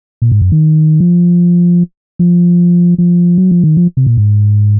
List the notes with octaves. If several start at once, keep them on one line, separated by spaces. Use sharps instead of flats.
A#2
G#2
F#2
D#3
F3
F3
F3
F#3
F3
D#3
F3
C3
A#2
G#2